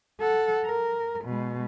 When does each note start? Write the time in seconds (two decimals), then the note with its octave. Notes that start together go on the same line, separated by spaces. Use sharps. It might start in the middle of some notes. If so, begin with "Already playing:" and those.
0.20 A4 F#5
0.65 A#4
1.25 B2 G#3